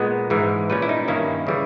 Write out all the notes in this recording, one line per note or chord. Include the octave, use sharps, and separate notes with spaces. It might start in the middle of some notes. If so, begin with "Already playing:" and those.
Already playing: A#2 G#3 B3 G#4
G#2 E3 G#3
A#2 G3 C#4 B4
E4
D#4
G2 D#3 A#3 C#4 E4
C#3 E3 G3